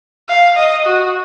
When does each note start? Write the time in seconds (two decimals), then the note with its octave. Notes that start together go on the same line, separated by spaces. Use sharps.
0.29 F5
0.57 D#5
0.86 F#4